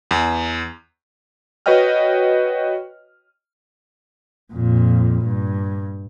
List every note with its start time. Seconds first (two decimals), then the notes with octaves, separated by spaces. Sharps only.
0.11 E2
1.66 F#4 B4 C#5 D#5 G5 F6
4.53 F2 A#2
5.24 G2